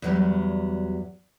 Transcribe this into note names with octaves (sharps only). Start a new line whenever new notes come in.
E2 F#3 G3